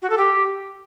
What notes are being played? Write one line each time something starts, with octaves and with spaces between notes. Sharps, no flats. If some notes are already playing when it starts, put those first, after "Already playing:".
F#4
A4
G4